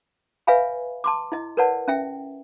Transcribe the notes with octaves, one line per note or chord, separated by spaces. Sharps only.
B4 C#5 E5 F5 G#5 B5
A5 C6 D6
E4 D#5
A#4 B4 C#5 D5 F#5 A5
C#4 E5 G5